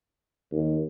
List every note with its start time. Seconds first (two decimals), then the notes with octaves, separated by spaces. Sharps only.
0.52 D#2